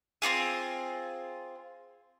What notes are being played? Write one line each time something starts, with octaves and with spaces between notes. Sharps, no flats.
C4 D#4 F4 G#4